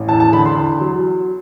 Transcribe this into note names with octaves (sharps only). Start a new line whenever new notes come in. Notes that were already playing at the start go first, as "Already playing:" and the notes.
Already playing: A1
E2 A5
A5
D3 B5
C6
E2
F#3